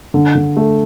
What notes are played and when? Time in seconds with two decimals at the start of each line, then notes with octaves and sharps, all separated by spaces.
0.14 D3
0.35 D3
0.57 A3